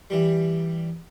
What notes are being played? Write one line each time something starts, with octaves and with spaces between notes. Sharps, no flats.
E3 G3